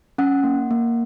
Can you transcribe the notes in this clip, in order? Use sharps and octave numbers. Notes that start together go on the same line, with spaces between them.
C#4 F#5
A#3
A#3